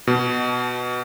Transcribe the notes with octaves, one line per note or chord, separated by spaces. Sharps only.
B2